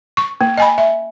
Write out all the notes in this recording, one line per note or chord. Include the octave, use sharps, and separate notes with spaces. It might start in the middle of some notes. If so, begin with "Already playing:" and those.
C#6
A#3
D#5 G#5 B5
E5